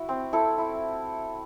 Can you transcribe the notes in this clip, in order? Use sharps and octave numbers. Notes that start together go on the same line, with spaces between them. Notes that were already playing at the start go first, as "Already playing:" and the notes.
Already playing: E4 F#4
C4
E4 A4
E4